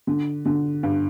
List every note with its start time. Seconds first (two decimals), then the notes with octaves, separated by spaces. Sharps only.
0.07 D3
0.45 D3
0.83 G2